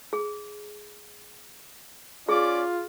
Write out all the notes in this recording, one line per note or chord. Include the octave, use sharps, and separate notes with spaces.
G#4
C#4 F4 G#4 D5 D6